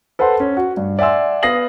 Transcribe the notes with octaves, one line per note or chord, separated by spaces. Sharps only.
A4 B4 C5 F#5 C6
C#4
F#4
G2
D5 E5 F#5 G#5 C6 E6
B3 F5 D#6 A#6 C7 F#7